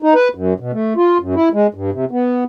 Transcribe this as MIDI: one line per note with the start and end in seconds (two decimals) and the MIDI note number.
0.03 0.14 63
0.15 0.28 71
0.35 0.54 42
0.60 0.72 47
0.73 0.94 57
0.96 1.18 65
1.20 1.35 42
1.35 1.49 64
1.53 1.67 56
1.74 1.91 43
1.93 2.05 48
2.11 2.44 59